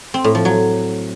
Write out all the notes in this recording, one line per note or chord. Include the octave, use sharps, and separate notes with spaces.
C4
A2
F3
F#3